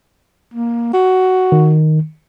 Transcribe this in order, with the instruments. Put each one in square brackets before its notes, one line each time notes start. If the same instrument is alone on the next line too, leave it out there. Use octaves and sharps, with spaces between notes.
[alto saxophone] A#3
F#4
[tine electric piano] D#3